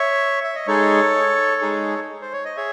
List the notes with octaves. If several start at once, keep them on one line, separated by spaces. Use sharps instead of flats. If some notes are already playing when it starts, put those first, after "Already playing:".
Already playing: C#5 E5
E5
D#5
G#3 D#4 G#4 A4 C#5
G#3 D#4 G#4
C5
C#5
D#5
G#4 C#5 E5